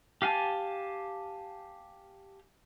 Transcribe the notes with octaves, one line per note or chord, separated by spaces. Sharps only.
G4 F5 G#5 A5